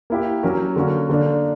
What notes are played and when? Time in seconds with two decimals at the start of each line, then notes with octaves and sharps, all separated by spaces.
0.10 A#3 E4 G4
0.43 F#3 C#4 F#4 A#4
0.76 D3 A#3 C#4 F#4 A#4
1.09 D3 A#3 D4